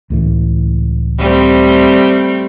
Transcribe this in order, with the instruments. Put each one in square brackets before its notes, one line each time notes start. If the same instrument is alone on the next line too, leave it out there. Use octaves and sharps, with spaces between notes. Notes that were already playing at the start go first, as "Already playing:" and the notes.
[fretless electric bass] C#2 A2 E3
[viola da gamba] G3 A3 C4